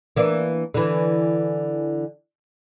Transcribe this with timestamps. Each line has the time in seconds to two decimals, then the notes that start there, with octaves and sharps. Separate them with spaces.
0.16 E3 A#3 D4
0.74 D3 E3